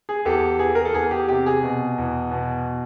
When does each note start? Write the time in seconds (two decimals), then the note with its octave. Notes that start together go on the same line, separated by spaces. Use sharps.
0.09 G#4
0.25 E2 G4 A4
0.59 E3 G#4
0.75 A#4
0.85 A4
0.94 E2 G#4
1.11 G4
1.28 C3 G4
1.46 G#4
1.63 B2
1.98 E2
2.31 B2